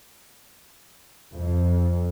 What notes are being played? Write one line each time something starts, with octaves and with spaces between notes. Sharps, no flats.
F2